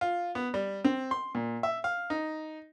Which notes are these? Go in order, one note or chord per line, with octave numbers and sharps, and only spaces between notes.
F4
B3
G3
C4
C6
A#2
E5
F5
D#4